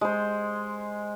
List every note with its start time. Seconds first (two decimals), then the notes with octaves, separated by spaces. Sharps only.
0.01 G#3 C5